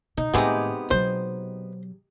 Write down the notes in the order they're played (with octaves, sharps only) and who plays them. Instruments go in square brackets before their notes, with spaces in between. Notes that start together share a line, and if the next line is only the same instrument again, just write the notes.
[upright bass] B2 [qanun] D#4
[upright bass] A2 D#3 [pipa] C3 G#3 B3 [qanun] G4 G#4 A#5
[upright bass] B2 F#3 [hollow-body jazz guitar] C5